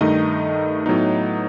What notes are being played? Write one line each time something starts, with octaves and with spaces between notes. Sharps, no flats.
G2 D#3 A3 D#4 D#5
A2 F#3 B3 D#4